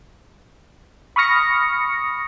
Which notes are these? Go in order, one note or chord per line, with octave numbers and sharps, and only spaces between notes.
B5 C#6 D#6 F6 A#6 C#7